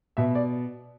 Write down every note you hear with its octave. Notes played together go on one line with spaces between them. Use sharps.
B2 E5
D5